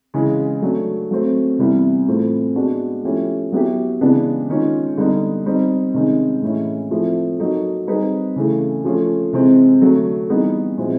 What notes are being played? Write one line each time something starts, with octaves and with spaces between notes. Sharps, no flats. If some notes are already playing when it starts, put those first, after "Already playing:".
C#3 E3 G#3
F#3 A3 D4
F#3 A3 C4
C3 E3 G3 B3 E4
A2 E3 A3 C4 F4
G#3 B3 D4 F#4
F3 A3 C#4 E4 G4
F#3 B3 E4 G4
C#3 E3 G#3 B3 D4
D#3 G#3 C#4 F4
D3 G3 B3 D#4
G3 C4 D#4
C3 D#3 G#3 C#4
A2 E3 G#3 C#4 E4
F3 A3 C4 E4
F#3 A#3 D#4 F#4 A4
G3 C4 D#4 G#4 B4
C#3 E3 A3
F3 A3 C#4 F4
C3 E3 G#3 C4
D3 F#3 A3
E3 G3 B3 D#4 G#4
A#2 F3 G#3 C4 E4